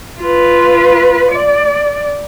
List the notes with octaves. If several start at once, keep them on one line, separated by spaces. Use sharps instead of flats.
F4 B4
D5